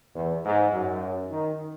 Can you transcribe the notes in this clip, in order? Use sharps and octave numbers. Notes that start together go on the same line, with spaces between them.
E2
G#2
F#2
D#3